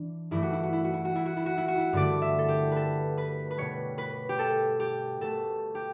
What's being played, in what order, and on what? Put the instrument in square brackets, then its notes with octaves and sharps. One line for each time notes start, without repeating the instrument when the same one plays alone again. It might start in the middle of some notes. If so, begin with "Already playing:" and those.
Already playing: [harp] E3 D4
G2 E3 A3 E4
F#4
E4
F#4
E4
F#4
E4
F#4
E4
F#4
E4
F#4
E4
F#4
E4
G2 D3 A3 D5
E5
A4
G4
A4 B4
B4
B4
B2 G3 C#5
B4
G4
A4
G4
B2 A3 A4
G4